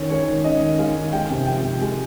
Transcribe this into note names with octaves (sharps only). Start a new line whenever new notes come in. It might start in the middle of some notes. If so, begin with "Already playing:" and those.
Already playing: D#3 C#4 C#5
G#3 C#5
D#3
C#4 D#5
D#3
G#3 F5
D#3
G#3 G5
C3
F3 G5
C3
G#3